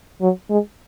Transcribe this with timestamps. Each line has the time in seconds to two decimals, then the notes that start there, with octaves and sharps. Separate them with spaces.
0.21 F#3
0.50 G#3